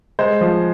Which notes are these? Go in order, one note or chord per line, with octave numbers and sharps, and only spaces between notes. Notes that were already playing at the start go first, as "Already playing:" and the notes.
G#3 C5
F3